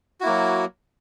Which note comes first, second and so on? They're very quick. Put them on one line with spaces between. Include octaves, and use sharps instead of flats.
F#4 E4 A#3 F#3